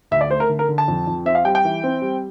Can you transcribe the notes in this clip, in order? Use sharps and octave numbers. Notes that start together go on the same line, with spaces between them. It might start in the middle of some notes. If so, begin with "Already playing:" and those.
D2 E5
D5
A3 C5
A#4
D3
A#4
D3
A5
F2
F2
C4 E5
F5
G3 G5
G5
E3
C4
G3